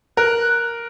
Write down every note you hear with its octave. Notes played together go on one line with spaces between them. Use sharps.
A#4 F#6